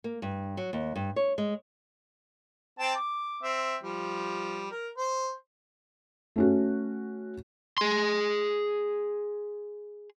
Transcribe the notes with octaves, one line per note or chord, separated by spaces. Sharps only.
A#3
G2
F#3
D#2
G2
C#5
G#3
C4 G5 A5
D6
C4 E5
F3 G3
A#4
C5
A3 C#4 F#4
G#4 C6